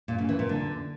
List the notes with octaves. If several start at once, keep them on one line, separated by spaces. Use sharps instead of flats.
A#2
C#3
E3
A#2
D3